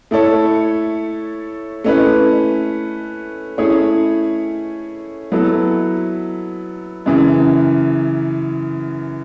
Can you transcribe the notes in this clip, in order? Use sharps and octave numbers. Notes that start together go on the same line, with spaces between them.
A3 E4 A4 C#5
A3 C#4 E4 B4
A3 C#4 E4 G#4 C#5
F#3 B3 E4 A4
F#2 C#3 E3